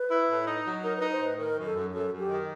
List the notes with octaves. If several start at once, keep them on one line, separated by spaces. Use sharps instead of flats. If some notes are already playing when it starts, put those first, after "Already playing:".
Already playing: B4
E4
A2
D#4
F#3
D#4 A#4
B4
D#4
C5
A2 B4
D#3 A#4
F#2
A4
F#2
F#2 A4
F#2
G4
D#3